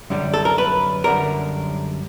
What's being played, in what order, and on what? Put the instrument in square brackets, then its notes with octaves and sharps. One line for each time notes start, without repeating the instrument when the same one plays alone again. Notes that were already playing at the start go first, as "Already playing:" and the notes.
[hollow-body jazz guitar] F#2 D3 G3
A4
A#4
B4
F#2 D3 G3 A#4